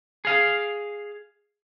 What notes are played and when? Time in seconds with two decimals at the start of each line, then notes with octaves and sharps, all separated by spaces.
0.25 G#4 F5